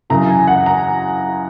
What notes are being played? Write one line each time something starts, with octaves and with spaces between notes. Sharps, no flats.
F#2 C#3 E3 A#5
G#5
F#5
A#5